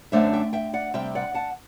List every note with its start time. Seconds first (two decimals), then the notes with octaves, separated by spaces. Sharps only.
0.12 F#2 D3 A3 D4 C5 E5
0.33 E5 G5
0.53 E5 G5
0.73 D5 F#5
0.94 C3 G3 C4 E5 G5
1.15 D5 F#5
1.34 F#5 A5